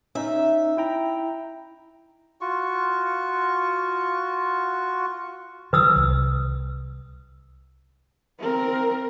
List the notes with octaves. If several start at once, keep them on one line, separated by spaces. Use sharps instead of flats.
C#4 D#4 E5
E4 G5 A#5
F4 F#4 C#6
D#3 F#3 B4 D#6 E6
C2
C4 A#4